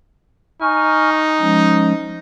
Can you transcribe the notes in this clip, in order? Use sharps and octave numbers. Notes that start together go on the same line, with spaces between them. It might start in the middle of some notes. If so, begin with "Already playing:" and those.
D#4 G#5 C#6 F6
F3 G#3 C#4